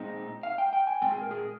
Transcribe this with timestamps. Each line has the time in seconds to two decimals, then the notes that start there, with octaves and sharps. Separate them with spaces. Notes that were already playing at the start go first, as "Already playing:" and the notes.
Already playing: A#2 G#3 C4 D#4
0.43 F5
0.58 G5
0.73 G5
0.87 G#5
1.01 A#2 G#3 C4 G5
1.12 G#4
1.21 A#4
1.31 G#4